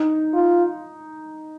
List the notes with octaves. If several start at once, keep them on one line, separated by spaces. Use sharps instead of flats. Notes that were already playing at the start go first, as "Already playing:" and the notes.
Already playing: D#4
F4